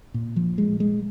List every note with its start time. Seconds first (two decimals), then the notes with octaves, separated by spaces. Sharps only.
0.14 A#2
0.36 F3
0.58 G#3
0.80 G#3